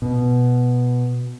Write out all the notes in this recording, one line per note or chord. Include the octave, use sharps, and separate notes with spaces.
B2